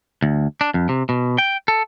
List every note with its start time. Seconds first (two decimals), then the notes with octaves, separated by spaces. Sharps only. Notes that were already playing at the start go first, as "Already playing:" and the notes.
0.22 D2
0.61 D4
0.74 F2
0.89 C3
1.09 B2
1.38 G5
1.68 A4